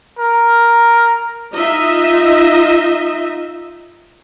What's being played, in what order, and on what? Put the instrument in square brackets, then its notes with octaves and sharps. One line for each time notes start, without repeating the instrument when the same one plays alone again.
[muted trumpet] A#4
[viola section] D#4 F4 D#5 E5